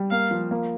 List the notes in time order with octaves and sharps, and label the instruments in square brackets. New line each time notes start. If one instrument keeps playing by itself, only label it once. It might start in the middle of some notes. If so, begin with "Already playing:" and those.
Already playing: [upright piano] G3
[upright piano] A#3 [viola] F5
[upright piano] F3
A#3